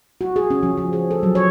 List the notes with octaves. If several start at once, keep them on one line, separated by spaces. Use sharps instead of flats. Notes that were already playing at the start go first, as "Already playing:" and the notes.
F#4
G#4
C#4
F3
F3
G#4
A4
F#3
C#5